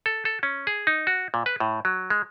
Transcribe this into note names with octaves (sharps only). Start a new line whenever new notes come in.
A4
A4
C#4
G#4
D#4
F#4
A#2
B4
A2
F#3
G#3